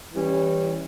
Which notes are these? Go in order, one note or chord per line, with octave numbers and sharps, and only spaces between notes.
E3 G3 C#4